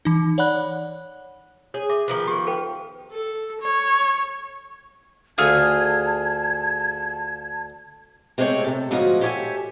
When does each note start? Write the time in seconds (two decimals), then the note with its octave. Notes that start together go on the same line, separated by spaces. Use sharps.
0.05 E3 D#4
0.38 C#5 D5 F#5 B5 F#6
1.74 G#4 C#5
1.89 E5 D6
2.08 D#3 F3 B3
2.27 G4 G#4
2.47 A4 B4 G5
3.12 A4
3.61 C#5
5.38 D2 F4 G#4 C#5 E5 A5 G#6
8.38 C3 G#3 A3 C#4 C#5 G5
8.64 C3 A4
8.91 D2 G#2 F3 C#4 F#4 D#5
9.21 G4 A4 C#5 D5 E5 G#5